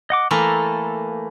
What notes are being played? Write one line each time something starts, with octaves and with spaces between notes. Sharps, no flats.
D#5 F#5 D6
E3 A3 A#3 A4 A#5